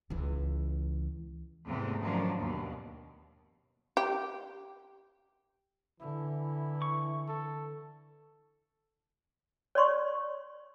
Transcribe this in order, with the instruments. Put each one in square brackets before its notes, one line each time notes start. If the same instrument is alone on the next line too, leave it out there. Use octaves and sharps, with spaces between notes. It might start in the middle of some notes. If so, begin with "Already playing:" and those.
[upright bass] C#2 E3
[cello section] E2 G#2 C3 E3 A3 B3
F#2 D#3 F3 D4
D#2 B2
[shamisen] G4
[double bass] D3 [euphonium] E3 [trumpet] E4
[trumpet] E4
[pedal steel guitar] C#6
[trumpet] A4
[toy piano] C#5 D5 C6 C#6